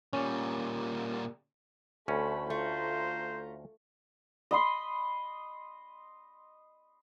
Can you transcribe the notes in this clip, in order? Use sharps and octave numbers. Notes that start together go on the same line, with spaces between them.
A#2 G3 C#4
D2 A3 C#4 B5
A3 F4 C5 A#5
D#5 B5 C6